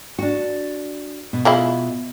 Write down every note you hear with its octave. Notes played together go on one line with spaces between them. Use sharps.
D4 F#4
B2
F3 G#3 E4